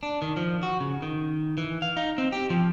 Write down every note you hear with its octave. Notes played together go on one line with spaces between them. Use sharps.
D4
D#3
F3
F#4
C#3
D#3
E3
F5
D#4
C4
G4
F3